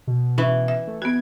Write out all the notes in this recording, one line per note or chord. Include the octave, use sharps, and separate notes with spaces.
B2
E3 C#4
E5
A3
B3 F#4 G#6